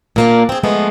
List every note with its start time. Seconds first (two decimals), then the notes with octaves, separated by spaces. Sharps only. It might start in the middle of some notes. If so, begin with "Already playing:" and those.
0.16 A#2 A#3 D4
0.49 C4 G#4
0.64 F3 G#3 A3 B3